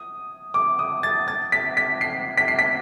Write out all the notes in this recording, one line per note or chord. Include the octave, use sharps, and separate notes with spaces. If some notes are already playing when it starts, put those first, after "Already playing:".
Already playing: D#6
D6
D#6
A6
A6
B6
B6
C7
B6
C7
B6